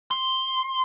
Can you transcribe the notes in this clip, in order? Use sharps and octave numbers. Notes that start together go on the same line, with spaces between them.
C6